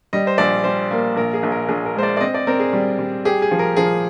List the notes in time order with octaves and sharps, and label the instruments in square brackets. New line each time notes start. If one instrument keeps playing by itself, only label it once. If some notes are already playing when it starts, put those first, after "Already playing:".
[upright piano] G3 [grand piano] D#5
[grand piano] C5
[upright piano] A#1 [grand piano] D5
[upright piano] G3 [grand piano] C5
[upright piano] A#3
[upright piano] A#1 [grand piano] A#4
[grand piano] G#4
[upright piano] A#1
[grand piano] A#4
[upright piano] A#1 [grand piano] G#4
[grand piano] A#4
[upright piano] G#3 [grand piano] C5
[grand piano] D5
D5
[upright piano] C4 [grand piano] D#5
[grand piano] D5
[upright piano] C4 [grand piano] A#4
[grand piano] G#4
[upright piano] G3
G3
[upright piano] G4 [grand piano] G#4
[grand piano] G#4
[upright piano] F3
[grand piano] A#4
[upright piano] F3 [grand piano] G#4